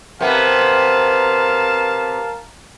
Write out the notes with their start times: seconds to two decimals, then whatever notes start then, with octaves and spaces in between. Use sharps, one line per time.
0.21 C3 B3 A#4 F5 A5